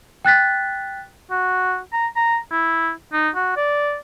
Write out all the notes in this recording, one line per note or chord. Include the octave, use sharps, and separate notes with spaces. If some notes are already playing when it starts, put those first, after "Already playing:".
G5 F#6 A6 B6
F#4
A#5
A#5
E4
D#4
F#4
D5